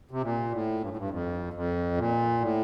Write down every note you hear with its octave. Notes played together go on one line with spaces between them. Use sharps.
C3
A#2
A2
G2
A2
G2
F2
F2
A#2
A2